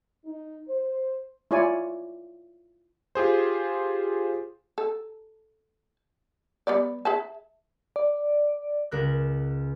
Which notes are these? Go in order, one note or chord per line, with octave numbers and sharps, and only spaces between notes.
D#4
C5
E4 F4 C#5 D5 G#5
F4 G4 G#4 C5
A4
G3 B3 D5
G#4 E5 A5
D5
C#2 A#4 F#6